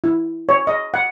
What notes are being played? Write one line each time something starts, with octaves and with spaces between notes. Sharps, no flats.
E4
C#5
D#5
F#5